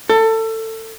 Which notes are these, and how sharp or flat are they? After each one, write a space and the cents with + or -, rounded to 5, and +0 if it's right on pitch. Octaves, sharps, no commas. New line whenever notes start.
A4 +25